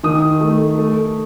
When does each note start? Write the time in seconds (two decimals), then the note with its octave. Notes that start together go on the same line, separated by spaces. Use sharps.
0.03 D#3 D#6
0.40 A3
0.78 A3